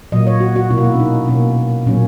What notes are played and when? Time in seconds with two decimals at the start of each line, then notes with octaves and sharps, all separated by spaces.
0.12 A#2 F#3 A#3 D#5
0.27 C#5
0.41 F#4
0.56 F#4
0.70 B2 A#3 E4
0.78 F#4
0.84 E4
0.94 C#4
1.00 D#4
1.28 B2 A#3 C#4
1.86 A#2 F#3 A#3 C#4